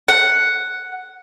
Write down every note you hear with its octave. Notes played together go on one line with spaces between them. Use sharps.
F#5